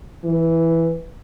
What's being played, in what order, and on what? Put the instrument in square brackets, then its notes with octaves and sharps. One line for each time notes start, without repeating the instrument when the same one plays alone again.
[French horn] E3